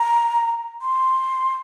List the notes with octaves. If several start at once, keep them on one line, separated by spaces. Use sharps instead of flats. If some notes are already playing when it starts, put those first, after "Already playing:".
Already playing: A#5
C6